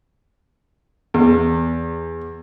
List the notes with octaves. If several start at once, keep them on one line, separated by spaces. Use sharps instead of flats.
E2